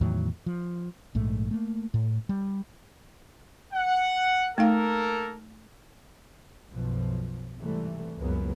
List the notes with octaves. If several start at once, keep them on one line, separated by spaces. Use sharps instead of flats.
E2 A2 D#3 F#3
F3
A#1 G#2 A3
A3 A#3
A2
G3
F#5
A3 A#3 D#4 A4 A#4 F5
B1 F#2 B2 F3
G#2 C3 E3 G3 A3
C#2 F#2 F#3 A#3 B3